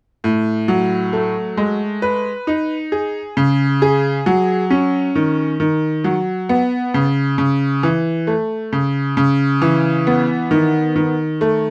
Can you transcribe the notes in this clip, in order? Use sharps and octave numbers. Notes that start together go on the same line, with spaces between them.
A2
F#3
A3
G#3
B4
D#4
G#4
C#3
G#4
F#3
C#4
D#3
D#3
F#3
B3
C#3
C#3
E3
A3
C#3
C#3
E3
B3
D#3
D#3
A3